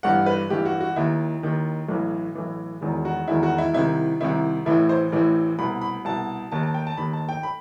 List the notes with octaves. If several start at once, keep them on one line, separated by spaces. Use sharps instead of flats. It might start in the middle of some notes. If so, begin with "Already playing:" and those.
G1 G2 E3 F#5
B4
G1 G2 E3 G4
F#4
F#4
D#2 D#3 E4
D#2 D#3
B1 A2 E3
B1 A2 E3
E1 E2 D#3
F#4
E1 E2 D#3 E4
F#4
E4
C2 C3 D#3 E4
C2 C3 D#3 E4
A1 A2 E3 E4
C5
A1 A2 E3
C2 B2 B5
B5
C2 B2 A5
D#2 D#3 A5
A5
G5
A5
D#2 D#3 B5
A5
G5
B5